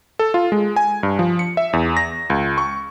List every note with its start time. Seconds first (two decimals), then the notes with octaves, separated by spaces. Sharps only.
0.19 A4
0.34 F4
0.52 G#3
0.76 G#5
1.03 G2
1.19 F3
1.39 C#7
1.57 E5
1.73 E2
1.97 A#6
2.30 C#2
2.58 C#6